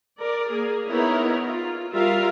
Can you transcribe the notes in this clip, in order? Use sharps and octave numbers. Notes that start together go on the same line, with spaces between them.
A#4 D5
A#3 G#4
B3 D#4 E4 A#4 C#5
F4
G3 F4 A#4 E5 F5